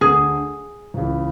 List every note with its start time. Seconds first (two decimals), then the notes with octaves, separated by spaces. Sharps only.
0.01 D2 D3 A3 G#4
0.94 C#2 C#3 E3